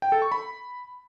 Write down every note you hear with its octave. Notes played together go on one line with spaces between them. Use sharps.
G5
A4
C#6
B5